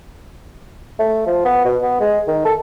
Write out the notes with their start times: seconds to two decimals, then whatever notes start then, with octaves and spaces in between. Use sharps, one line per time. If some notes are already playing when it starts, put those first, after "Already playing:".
0.99 A3
1.27 F3
1.45 B3
1.65 B2
1.83 B3
2.00 G#3
2.27 D#3
2.45 A4